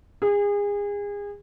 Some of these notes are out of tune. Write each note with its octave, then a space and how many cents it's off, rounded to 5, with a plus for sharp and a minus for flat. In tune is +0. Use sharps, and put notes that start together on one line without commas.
G#4 -30